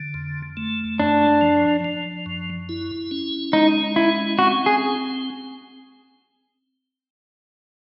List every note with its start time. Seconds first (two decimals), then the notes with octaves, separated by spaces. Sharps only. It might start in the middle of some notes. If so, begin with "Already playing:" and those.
Already playing: D3
0.14 F2
0.57 A3
1.00 F#2 D4
1.41 F3
1.84 F3
2.26 F#2
2.69 E4
3.11 C#4
3.53 G#3 D#4
3.96 C#4 E4
4.38 C4 F#4
4.66 G#4